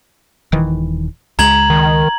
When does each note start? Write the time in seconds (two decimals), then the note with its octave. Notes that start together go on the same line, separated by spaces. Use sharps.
0.52 D#1 D#3 E3
1.39 C#2 G#3 A#5 G#6 F#7
1.70 D#3